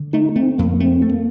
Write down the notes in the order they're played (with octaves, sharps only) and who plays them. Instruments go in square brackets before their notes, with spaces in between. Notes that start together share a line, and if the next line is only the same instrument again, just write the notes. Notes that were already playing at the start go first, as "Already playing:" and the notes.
Already playing: [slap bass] D3
[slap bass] A3 [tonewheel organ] D#4
[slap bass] A3 [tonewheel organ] C4
[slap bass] F2 [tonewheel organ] A#3
[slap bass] A3 [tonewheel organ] C4
[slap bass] A3
[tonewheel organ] A#3